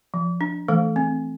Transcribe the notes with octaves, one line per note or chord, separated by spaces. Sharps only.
F3
D4
E3 A3 A4
C4